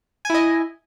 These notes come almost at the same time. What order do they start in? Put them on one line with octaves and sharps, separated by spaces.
G#5 E4 D#5